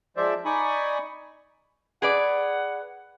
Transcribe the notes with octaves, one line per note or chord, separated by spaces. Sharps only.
F3 G#3 C5 D5 E5
D#4 D5 G#5 B5 C#6 D#6
G#4 B4 D5 F#5